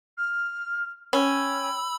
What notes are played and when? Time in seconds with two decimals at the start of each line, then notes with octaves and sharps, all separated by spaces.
0.17 F6
1.13 C#4 G5 B5 E6